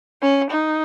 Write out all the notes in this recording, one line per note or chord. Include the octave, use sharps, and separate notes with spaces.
C#4
D#4